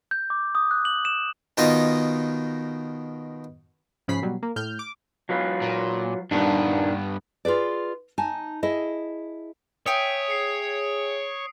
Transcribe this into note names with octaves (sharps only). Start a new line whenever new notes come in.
G6
D6
D#6
F#6
F#7
E7
B2 D#3 D#4 F4 D#5
G#2 C#3 F3 B5 B6 C7
B2 F#3 G3
A#3
A2 F6 G6
D6
F#3 F4 B4
A#2
G2 A#2 D#3 B3 D4
F4 G#4 B4 D5
D#4 G#5 A5
E4 G#4 D#5
C#5 E5 G5 G#5 D#6 D7
G#4 C7 C#7